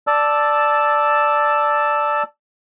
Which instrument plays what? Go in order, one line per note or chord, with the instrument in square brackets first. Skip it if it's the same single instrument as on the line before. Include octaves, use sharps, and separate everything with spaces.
[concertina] D5 A5 E6